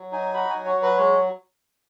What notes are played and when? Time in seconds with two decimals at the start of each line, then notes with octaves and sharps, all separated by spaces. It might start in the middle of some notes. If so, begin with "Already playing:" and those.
Already playing: F#3
0.12 D#4 G#5
0.34 F#4 B5
0.50 G#5
0.56 F#3
0.65 C#5
0.77 F#3
0.82 B4
0.98 G#3 C#5